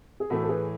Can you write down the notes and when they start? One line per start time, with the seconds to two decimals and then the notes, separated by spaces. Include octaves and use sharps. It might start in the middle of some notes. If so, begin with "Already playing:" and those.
0.20 G#4
0.30 A2 E3 A3 F#4 A4
0.43 A4
0.49 G#4 B4